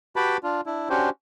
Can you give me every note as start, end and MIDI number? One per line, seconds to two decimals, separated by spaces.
0.16 0.37 66
0.16 0.37 67
0.16 0.37 71
0.16 0.37 79
0.16 0.37 81
0.16 0.37 83
0.43 0.61 62
0.43 0.61 65
0.66 0.89 62
0.66 0.89 64
0.90 1.10 61
0.90 1.10 62
0.90 1.10 66
0.90 1.10 67
0.90 1.10 72